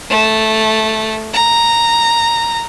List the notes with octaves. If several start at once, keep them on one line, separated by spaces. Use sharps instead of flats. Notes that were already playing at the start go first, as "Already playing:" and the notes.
A3
A#5